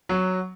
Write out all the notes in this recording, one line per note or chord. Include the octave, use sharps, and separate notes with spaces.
F#3